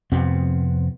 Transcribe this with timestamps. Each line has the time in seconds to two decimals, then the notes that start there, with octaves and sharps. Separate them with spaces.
0.12 F2 C3 B3 C4